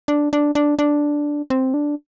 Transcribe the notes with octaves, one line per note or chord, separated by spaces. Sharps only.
D4
D4
D4
D4
C4
D4